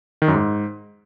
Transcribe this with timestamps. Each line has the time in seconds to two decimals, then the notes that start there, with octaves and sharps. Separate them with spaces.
0.22 D#3
0.28 F#2
0.34 G#2